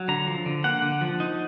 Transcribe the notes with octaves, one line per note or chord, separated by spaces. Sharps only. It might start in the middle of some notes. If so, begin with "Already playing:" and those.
Already playing: F#3
D3 A#5
F3
D3
A#3 F#5
D3
F3
D#4